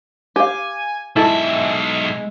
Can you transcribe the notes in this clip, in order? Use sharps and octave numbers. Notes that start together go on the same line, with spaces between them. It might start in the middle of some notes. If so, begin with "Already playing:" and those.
G4 F5 G#5
B1 G#3 E4 A4 E5 A5